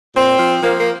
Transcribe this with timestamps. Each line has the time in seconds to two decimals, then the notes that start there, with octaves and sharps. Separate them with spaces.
0.16 A#2 C4
0.39 F3
0.62 F3 A#3
0.78 A#3